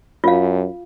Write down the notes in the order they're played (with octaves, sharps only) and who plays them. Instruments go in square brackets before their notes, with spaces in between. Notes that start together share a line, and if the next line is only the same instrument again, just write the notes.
[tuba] F#2 [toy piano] F4 F5